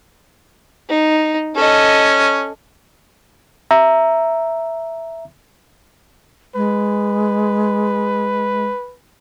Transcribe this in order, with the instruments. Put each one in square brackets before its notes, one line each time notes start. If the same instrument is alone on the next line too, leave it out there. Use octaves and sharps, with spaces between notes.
[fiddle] D#4
[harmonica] C#4 [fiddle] A4 D#5
[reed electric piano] E5 A#5
[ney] G#3 [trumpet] B4